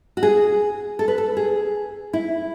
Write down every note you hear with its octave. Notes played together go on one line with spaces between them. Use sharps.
F#4
G#4
A4
B4
A4
G#4
E4